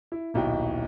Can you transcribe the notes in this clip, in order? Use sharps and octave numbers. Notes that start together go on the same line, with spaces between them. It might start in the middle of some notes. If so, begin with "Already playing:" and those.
E4
D#1 B1 E4 F#4 D#5 G5